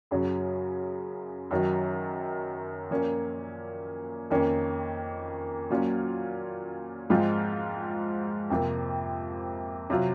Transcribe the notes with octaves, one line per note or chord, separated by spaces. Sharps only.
F#2 C#3 F#3 C#4
F#2 D#3 F#3
A#2 F3 A#3 C#4
F2 D#3 A#3 C#4
A#2 F#3 C#4 F4
G#2 F3 G#3 C4 F4
F2 C3 F3 A#3
C3 F#3 C4 F4